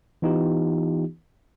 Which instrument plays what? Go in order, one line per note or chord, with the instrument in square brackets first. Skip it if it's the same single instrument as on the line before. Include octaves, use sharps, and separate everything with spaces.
[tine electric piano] E3 B3 D#4 F4 G4